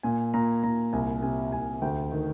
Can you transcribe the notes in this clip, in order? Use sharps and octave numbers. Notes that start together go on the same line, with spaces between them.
A#2 G#5
A#2 A#5
A#2 A#5
C2 G#5
C3 G#5
C2 G#5
D2 G5
D#3